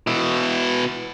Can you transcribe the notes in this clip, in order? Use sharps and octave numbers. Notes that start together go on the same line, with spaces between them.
B2 E4